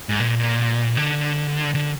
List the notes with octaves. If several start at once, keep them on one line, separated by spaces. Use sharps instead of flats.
G#2
A#2
D3
D3